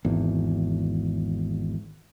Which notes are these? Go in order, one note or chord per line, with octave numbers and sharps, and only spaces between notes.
G#1 E2